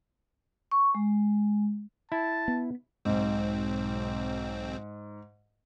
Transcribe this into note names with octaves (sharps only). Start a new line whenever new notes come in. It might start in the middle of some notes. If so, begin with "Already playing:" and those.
C#6
G#3
E4 A5
B3
B1 G#2 C4